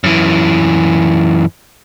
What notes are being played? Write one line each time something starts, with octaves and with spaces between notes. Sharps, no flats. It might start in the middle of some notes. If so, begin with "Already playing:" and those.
F#2 E3